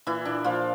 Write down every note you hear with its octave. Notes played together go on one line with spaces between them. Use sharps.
A#2 E3 E4
A#2 D4
A#2 F3 F4